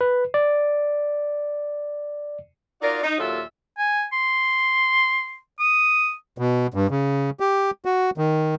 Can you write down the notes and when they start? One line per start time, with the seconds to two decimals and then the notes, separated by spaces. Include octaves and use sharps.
0.01 B4
0.34 D5
2.81 D#4 F4 F#4 A#4 D5
3.02 D#4
3.18 D#2 A#2 F#3 F4 A4 E5
3.78 G#5
4.13 C6
5.59 D#6
6.38 B2
6.74 G2
6.90 C#3
7.40 G4
7.85 F#4
8.18 D#3